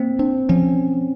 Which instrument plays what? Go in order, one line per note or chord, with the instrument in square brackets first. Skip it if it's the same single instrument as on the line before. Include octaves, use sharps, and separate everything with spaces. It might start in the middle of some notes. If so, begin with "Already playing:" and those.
Already playing: [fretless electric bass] A#3 [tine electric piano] C4
[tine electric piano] C4 [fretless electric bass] D4
[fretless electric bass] F3 [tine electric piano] C#4